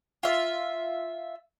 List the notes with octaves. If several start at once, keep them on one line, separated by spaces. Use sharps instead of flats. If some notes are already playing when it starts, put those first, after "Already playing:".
F4 E5